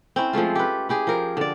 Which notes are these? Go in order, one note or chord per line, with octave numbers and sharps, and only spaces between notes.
C4 C#4 E4
F3 G#3 A3 F4
G4 B4
E4 G4 G#4
F3 A#4
D3 D5